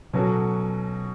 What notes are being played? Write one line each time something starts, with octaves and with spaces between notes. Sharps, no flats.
B2 F#3 C#4 F#4 A4